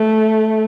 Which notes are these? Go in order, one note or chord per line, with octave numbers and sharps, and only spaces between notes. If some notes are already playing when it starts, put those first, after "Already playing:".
Already playing: A3